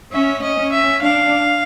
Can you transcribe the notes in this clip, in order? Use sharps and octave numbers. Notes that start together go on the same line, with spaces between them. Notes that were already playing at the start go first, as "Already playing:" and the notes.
C#4 E5
D#5
C#4
E5
D4 F5